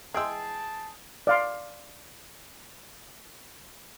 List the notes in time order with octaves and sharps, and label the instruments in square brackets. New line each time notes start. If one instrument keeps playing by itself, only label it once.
[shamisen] E3 G#3 [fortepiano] G#4 G5 E6 [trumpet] A5
[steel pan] D5 F5 C6